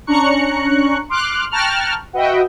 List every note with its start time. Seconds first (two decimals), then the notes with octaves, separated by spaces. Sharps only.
0.07 C#4 D4 A#5 C#6 F#6 C#7
1.09 C6 D6 F6 F#6
1.51 G5 A5 A#5 C#6 F6 F#6
2.13 F#4 B4 D#5 E5 F#5 G5